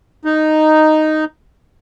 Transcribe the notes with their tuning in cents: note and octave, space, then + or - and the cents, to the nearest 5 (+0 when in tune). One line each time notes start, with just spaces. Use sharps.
D#4 -5